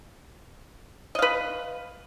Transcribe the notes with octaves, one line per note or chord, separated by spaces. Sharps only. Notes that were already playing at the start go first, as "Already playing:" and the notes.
B4 D#5 F5